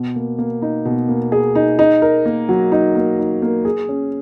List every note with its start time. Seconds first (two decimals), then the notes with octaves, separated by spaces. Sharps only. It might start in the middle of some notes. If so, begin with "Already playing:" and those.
Already playing: B2
0.16 A#3
0.38 A#3
0.62 D#4
0.85 B2
1.09 A#3
1.32 G#4
1.55 D#4
1.79 D#4
2.02 A#4
2.26 A#3
2.49 F#3
2.72 D#4
2.95 A#3
3.19 D#4
3.42 A#3
3.65 G#4
3.89 C#4